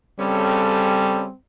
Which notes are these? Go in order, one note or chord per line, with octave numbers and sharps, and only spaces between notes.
C#3 G3 C4 C#4 A4